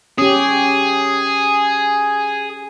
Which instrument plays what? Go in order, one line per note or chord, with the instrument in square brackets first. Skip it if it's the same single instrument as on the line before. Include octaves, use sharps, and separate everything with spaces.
[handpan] C#4 G4 [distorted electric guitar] G#4